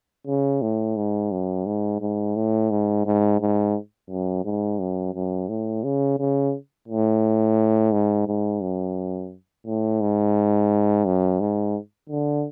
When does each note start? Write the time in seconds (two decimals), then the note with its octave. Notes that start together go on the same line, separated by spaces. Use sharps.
0.27 C#3
0.62 A2
0.96 G#2
1.32 F#2
1.66 G#2
2.01 G#2
2.36 A2
2.71 G#2
3.06 G#2
3.40 G#2
4.09 F#2
4.45 G#2
4.79 F#2
5.14 F#2
5.49 A2
5.84 C#3
6.19 C#3
6.88 A2
7.92 G#2
8.27 G#2
8.62 F#2
9.66 A2
10.01 G#2
11.06 F#2
11.40 G#2
12.10 D3